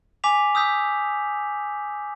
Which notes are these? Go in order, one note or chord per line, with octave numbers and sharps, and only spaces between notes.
G#5 D6 B6 F7
D#6 E6 G6 B6